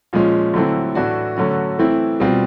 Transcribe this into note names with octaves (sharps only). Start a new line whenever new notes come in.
A#2 F3 G#3 C#4
D3 F#3 A3 C4 E4
A2 E3 A3 D4 F#4
D3 F#3 A3 C#4 F#4
E3 A3 C4 E4
B2 G3 C4 F4